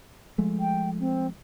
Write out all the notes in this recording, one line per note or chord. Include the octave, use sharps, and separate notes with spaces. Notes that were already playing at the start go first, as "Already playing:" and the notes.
F3 G#3 A3
G5
C4